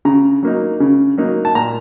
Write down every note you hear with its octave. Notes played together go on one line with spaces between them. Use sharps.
C#3 A#5
F#3 A#3 D#4
C#3
F#3 A#3 D#4
A5
A#2 A#5